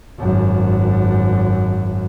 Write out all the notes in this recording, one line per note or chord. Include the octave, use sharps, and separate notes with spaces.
G#1 F#2